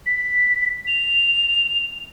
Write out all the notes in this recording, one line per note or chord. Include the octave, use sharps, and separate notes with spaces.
B6
F7